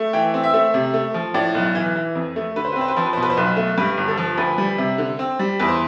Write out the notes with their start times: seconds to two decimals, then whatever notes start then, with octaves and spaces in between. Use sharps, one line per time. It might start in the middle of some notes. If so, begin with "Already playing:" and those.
Already playing: A3
0.13 E3 G5
0.34 C4
0.43 E5
0.54 A3
0.74 C3
0.94 A3
1.14 F3
1.34 A2 D5
1.55 B1
1.75 E3
1.96 E3
2.15 F2
2.36 A3
2.56 D3 B4
2.65 C5
2.72 B4
2.76 C4
2.81 C5
2.88 B4
2.96 F3 C5
3.06 B4
3.13 C5
3.17 B2
3.23 B4
3.30 C5
3.37 B1 B4
3.57 A3
3.78 G2 B4
3.97 G1
4.08 A4
4.17 F3
4.38 D2 B4
4.58 G3
4.78 C3
4.98 D3
5.19 C4
5.39 G3
5.59 E2 B4
5.68 C5